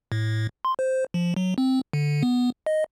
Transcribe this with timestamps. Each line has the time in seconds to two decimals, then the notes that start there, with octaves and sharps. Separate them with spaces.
0.12 A2
0.65 C6
0.79 C5
1.14 F3
1.36 F#3
1.58 C4
1.93 D3
2.23 B3
2.66 D#5